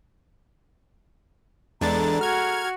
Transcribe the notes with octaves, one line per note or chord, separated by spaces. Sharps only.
E2 G#3 D4 A4 A#5 A6
F#4 F6 G#6